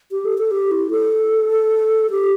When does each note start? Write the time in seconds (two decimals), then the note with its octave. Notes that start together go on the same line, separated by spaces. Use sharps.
0.11 G4
0.25 A4
0.38 A4
0.51 G4
0.71 E4
0.91 A4
2.10 G4